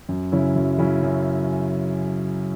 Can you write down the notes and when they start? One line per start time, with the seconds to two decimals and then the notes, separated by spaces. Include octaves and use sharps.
0.09 F#2
0.32 C#3 F#3 C#4 E4
0.56 F#2
0.78 C#3 F#3 C#4 E4
1.03 F#2